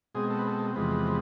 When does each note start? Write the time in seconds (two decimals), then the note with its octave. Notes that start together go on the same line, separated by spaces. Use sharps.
0.15 B2 G#3 C4 G#4
0.30 A4
0.39 B4
0.47 A4
0.75 E2 C3 F3 G#3 B4